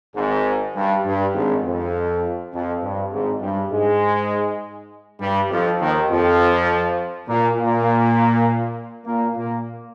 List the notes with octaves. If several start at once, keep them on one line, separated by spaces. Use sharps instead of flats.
G#1 G#2
G2
G2
G#1 G#2
F2
F2
G2
G#1 G#2
G2 G3
G#2 G#3
G2 G3
F2 F3
D#2 D#3
F2 F3
A#2 A#3
A#2 A#3
A#2 A#3
A#2 A#3